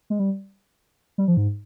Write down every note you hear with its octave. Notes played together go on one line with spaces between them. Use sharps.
G#3
G3
G3
F3
G#2